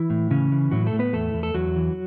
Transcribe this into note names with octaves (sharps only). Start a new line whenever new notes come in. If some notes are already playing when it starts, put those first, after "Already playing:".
Already playing: E3 E4
A2
C#3 E3 C#4
E3
A2 F#3 F#4
A3 A4
A2
B3 B4
E2 A3 A4
E2
A4
E2 F#3 F#4
E3